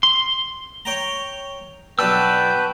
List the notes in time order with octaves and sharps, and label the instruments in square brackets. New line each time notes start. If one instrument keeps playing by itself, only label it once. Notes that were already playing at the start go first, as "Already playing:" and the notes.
[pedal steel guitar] C6
[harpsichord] C#5 G5 A#5
[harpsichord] B1 D4 [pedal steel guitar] F#4 A5 E6 [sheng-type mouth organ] B4 [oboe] G5